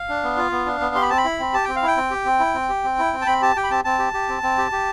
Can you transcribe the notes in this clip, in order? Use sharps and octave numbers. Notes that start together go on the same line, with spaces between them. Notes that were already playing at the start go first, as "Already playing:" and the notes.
Already playing: F5
D4
B3
F4
B3
D4
B3
G4 C6
B5
C4 A5
B5
E4
C4
G4 A5
C4 G5
F5
E4 G5
C4
G4
C4
E4
C4
G4
C4
E4
C4
A5
C4 B5
G4 A5
G4 G5
B5
C4 A5
C4 A5
G4
G4
C4
C4
G4
G4